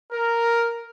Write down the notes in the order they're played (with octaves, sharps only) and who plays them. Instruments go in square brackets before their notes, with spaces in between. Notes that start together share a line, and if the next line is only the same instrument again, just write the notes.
[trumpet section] A#4